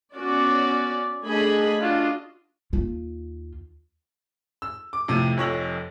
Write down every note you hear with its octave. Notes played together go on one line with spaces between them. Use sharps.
B3 C#4 F#4 D5
A3 D4 G#4 D#5 G#5 B5
D4 F4 F#4 D#5
D#2 F4
E6
D6
F2 A2 C3
F1 F2 C#5 E6 A#6 F#7